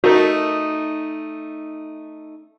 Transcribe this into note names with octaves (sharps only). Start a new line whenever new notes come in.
A3 D#4 F#4 A#4